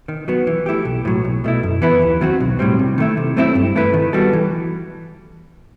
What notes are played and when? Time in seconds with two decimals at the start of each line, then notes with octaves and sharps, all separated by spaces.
0.08 D#3
0.28 F#3 B3 F#4
0.47 E3
0.66 A3 E4 G4
0.85 B1
1.05 A2 F#3
1.25 B1
1.44 B2 A3 E4
1.63 F#2
1.82 E3 B3 E4 B4
2.02 D#2
2.21 D#3 F#3 C4 F#4
2.40 B1
2.59 A2 G3 C4
2.79 C3
2.98 D#3 A3 E4
3.17 C3
3.37 F#3 A3 C4 E4
3.55 G2
3.75 E3 A3 E4 B4
3.94 D#3
4.13 G3 B3 F#4 A4
4.33 E3